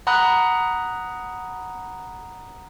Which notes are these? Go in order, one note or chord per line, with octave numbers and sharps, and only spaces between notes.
F#5 A#5 B5 D#6 F#6